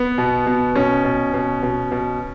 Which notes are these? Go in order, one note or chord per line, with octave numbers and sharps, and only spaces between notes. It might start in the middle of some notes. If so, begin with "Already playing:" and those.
Already playing: B3
B2
B2
B2 C#4
B2
B2
B2
B2